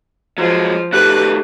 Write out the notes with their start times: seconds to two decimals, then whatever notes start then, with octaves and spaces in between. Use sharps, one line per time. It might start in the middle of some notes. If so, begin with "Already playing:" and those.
0.38 F3 F#3 G#3 F4
0.93 D#3 A3 G4 B4 F#6